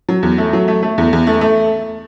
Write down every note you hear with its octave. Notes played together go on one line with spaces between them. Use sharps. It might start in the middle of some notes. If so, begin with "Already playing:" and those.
F#3
E2
A3
F#3
A3
A3
E2
E2
A3
A3